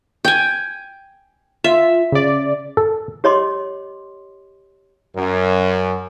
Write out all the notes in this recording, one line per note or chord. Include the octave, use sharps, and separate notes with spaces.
G5 G#5
F4 E5
C#3 D5
A4
G4 C#5 D#5 C6 D6
F#2